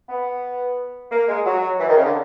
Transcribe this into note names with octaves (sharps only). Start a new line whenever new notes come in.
B3
A#3
G#3
F#3
E3
D#3
C#3
D3